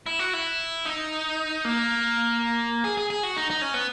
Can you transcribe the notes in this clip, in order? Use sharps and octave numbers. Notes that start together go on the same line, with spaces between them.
E4
F#4
E4
D#4
A#3
G#4
G#4
G#4
F#4
D#4
D#4
C#4
B3